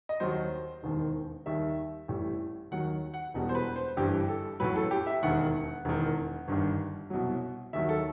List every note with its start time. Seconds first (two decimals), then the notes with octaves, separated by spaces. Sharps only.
0.09 D#5
0.20 D#2 D#3 F#3 C5
0.83 E1 D#2 D#3
1.46 D#2 D#3 G3 E5
2.08 A1 A2 G3
2.71 D#2 D#3 F#3 F#5
3.14 F#5
3.34 E1 E2 B2 G3
3.49 C5
3.55 B4
3.76 C5
3.96 G1 G2 E3 G3 G4
4.28 A4
4.60 A1 A2 F#3 B4
4.76 A4
4.91 G4
5.07 E5
5.23 E1 D#2 D#3 F#5
5.85 E1 E2 D#3
6.48 G1 G2 D#3
7.10 C2 B2 F#3
7.73 D#2 D#3 F#3 E5
7.89 A4